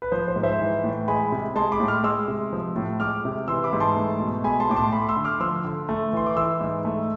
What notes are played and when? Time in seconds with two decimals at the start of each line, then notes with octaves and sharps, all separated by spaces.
0.02 B4
0.12 F3 C5
0.28 C5
0.36 G#2
0.43 C5 E5
0.60 E3
0.84 A2
1.08 G#3 G#5 B5
1.32 C3
1.56 G#3 A5 C6
1.72 B5 D6
1.80 A2
1.88 D6 F6
2.04 G#3 C6 E6
2.28 C3
2.53 F3
2.76 A2
3.00 G#3 D6 F6
3.25 C3
3.48 E3 C6 E6
3.64 B5 D6
3.73 G#2
3.80 A5 C6
3.96 A3
4.20 B2
4.44 G#3 G#5 B5
4.60 A5 C6
4.69 A2 D6
4.76 A5 C6
4.92 A3 B5 D6
5.09 C6 E6
5.17 D3
5.25 D6 F6
5.40 F3 C6 E6
5.65 D3
5.89 A3
6.13 E3 C6
6.26 D6
6.37 E3 C6 E6
6.61 G#2
6.85 A3